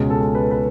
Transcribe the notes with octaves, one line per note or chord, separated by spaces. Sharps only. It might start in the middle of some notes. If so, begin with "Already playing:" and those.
Already playing: C#2 B2 G#3 C#4
A4
B4
B4